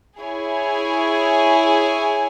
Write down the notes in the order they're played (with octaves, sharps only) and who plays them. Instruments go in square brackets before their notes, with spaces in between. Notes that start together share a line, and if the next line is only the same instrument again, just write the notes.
[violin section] E4 G#4 C#5 G#5